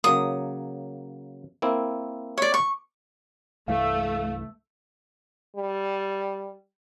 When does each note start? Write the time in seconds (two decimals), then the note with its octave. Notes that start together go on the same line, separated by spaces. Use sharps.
0.04 C#3 F#3 A#3 D#6
1.62 A#3 C4 E4
2.38 C#5 D5
2.54 C#6
3.68 C2 G2 E3 A3 F5
5.56 G3